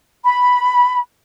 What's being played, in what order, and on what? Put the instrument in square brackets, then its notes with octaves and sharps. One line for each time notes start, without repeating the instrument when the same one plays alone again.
[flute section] B5